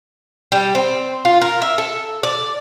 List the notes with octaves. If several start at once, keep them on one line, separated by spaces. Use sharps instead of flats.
G3
C4
F4
A#4
E5
A4
D5